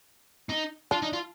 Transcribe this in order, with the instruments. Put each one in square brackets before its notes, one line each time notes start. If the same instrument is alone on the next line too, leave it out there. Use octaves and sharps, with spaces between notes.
[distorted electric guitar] D#4
[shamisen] D4 [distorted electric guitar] F4
[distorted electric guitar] D#4
F4